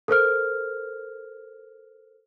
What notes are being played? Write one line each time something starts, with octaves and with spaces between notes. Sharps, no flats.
A4 A#4 C5 F6